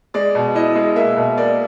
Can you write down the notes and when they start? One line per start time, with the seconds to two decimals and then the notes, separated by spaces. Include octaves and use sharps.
0.14 G#3 D5
0.35 B2
0.55 E4 D#5
0.75 G#3
0.96 A#3 E5
1.16 B2
1.37 A#3 D5